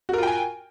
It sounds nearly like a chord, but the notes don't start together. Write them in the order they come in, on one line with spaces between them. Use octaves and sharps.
F#4 A#4 F4 G5 G#5